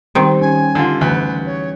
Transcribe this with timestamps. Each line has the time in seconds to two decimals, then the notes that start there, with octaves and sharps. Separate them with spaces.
0.15 D#3 G3 C4 D#4
0.41 C#4 G#5
0.75 D3 F4
1.01 D2 E3 B4
1.46 C#5